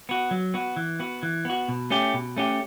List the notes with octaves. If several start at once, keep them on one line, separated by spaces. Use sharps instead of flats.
B3 F#4
F#3
B3 F#4
E3
B3 F#4
E3
B3 F#4
B2
A3 C#4 G4
B2
A3 C#4 G4